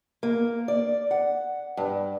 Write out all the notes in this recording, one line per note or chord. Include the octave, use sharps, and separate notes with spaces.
A#3
D5
F#5
G2